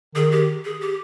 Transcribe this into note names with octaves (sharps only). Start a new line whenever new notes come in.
D#3 G#4
G4
G#4
G4